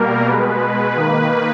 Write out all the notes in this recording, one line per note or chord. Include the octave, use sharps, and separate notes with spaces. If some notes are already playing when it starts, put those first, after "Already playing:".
Already playing: B2 G3 A#3 A#4
B2 G#3 B4
D#3 A#3 B4